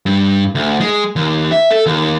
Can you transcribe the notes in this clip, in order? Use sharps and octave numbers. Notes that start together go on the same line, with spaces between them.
G2
D2
G#3
D#2
E5
A4
D#2